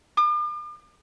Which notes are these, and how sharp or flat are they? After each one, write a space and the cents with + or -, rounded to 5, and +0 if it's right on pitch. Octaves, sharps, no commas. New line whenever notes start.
D6 +45